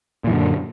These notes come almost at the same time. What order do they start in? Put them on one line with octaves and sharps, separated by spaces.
A#2 E3 F#2 D3